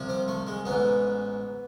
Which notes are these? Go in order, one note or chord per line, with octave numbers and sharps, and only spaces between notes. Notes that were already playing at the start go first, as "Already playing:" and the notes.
Already playing: C2 C3 F3
C4
A3
G#3
A1 G#2 E3 B3